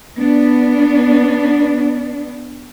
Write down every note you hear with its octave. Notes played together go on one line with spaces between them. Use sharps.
B3 D4